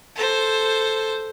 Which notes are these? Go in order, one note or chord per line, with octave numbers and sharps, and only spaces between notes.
A4 C5